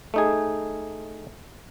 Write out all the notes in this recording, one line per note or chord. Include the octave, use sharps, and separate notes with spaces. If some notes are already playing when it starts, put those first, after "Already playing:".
A3 D#4 G#4